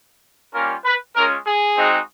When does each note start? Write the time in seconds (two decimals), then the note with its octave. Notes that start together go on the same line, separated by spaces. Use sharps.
0.53 G3 A#3 C#4 F4 A#4
0.84 B4
1.14 G#3 C#4 F4 A#4
1.45 G#4
1.77 G#3 C4 D#4 F#4